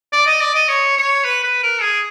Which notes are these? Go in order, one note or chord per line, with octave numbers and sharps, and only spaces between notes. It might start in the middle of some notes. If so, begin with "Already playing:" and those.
D5
D#5
D5
D#5
C#5
C#5
B4
B4
A#4
G#4